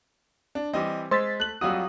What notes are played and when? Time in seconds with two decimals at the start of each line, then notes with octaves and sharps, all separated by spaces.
0.55 D4
0.74 E3 G3 C4 D#5
1.11 G#3 C5 C6 E6 A6 B6
1.40 A3 F#6 F#7
1.61 F2 F#3 G3 F4 F#4 D#6 E6